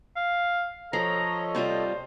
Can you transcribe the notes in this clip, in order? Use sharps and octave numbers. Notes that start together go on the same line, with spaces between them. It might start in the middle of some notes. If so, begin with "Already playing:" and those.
F5
F3 A4 C#5 D#5 A#5
C3 G3 F4 C5